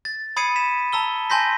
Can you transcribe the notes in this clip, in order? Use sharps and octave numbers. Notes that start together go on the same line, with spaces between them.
A6
B5 D#6 G#6 C7 C#7 D#7
B6 E7
A5 A#5 E6 G7
G#5 A5 C6 G6 A#6 B6